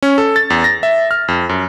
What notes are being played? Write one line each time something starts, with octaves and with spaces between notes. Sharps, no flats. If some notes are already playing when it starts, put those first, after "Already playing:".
C#4
A4
A6
E2
A#6
E5
F6
F2
F#2